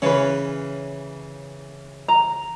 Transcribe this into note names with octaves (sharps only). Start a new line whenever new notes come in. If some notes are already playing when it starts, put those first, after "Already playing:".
C#3 E3 C#4 B4
A#5